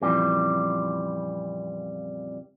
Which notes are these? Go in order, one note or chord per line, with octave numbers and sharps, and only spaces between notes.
F2 A#2 C#3 E3 G3